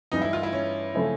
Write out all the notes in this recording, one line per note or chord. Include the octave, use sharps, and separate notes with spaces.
G2 E3 G3 D#4
E4
F4
E4
C#4
C#3 F3 A3 C4 E4